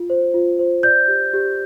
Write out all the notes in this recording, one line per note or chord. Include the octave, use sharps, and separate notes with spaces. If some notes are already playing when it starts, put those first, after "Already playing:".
Already playing: F4
C5
F4
C5
D5 G6
G4
G4